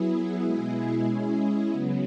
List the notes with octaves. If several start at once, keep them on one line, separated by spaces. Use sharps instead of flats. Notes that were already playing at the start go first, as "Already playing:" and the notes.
Already playing: F#3 B3 E4 G#4
B2 G#3 E4 G#4
G#3 C#4 E4 G#4
C#3 F#3 B3